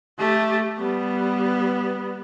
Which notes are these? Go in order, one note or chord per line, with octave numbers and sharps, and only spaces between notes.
A3 G4
G3 B3